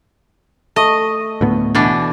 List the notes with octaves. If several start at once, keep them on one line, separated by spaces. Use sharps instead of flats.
A3 D#5
D2 A2 B3
B2 E3 D4